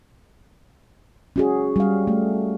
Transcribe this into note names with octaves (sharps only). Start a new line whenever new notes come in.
C#4 F#4 G#4
G3 F5
A3